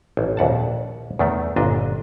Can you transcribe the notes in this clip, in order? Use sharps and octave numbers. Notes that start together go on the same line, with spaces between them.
A1
A#1 D#2 F#5 A5
E2 D#3 A3
G1 A#2 D4 D#5